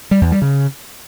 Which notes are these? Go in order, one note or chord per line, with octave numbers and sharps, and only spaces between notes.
G3
E2
G3
C#3